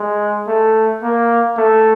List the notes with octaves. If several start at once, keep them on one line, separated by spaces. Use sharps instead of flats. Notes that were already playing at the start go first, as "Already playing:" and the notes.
Already playing: G#3
A3
A#3
A3